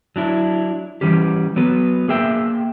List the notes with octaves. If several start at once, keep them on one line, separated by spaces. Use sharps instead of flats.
F#3 D4 E4
E3 G3 C#4 G4
F#3 B3 B4
A#3 G#4 E5 G5